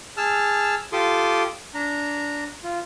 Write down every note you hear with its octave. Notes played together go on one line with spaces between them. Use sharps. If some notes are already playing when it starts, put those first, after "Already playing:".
G#4 A5 E6 F6
F4 G4 A4 C6 D6 D#6
D4 A#5
F4